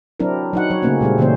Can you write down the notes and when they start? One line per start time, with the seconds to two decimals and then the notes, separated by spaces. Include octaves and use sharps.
0.20 F#3 C4 D4 E4 A#4
0.53 F#3 D#4 F#5
0.70 F#3 C#5
0.83 C#3 A3 A#3 C4 C#4
1.01 A#2 G3 G#3 C4
1.18 A#2 C#3 E3 A#3 C#4 C5